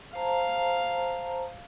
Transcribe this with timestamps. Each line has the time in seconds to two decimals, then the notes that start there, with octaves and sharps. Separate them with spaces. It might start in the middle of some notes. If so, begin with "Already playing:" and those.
0.15 C5 F5 A5 A#5